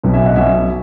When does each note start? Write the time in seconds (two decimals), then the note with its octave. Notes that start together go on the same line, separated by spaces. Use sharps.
0.04 B1 B2
0.14 E5 G#5
0.26 D#5 F#5
0.36 B1 B2 E5 G#5